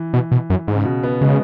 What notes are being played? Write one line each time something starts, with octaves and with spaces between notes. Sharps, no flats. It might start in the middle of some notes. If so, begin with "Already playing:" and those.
Already playing: E3
B2
B2
F#2
G#2
C#3
B2
B3
C#3 G#3